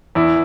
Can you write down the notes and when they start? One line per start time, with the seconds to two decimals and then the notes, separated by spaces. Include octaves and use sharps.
0.15 E2 E4